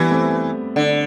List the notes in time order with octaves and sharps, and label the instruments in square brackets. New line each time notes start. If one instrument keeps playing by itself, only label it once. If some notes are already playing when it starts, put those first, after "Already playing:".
Already playing: [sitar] E3 [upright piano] G3 B3
[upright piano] A3 C4
[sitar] D3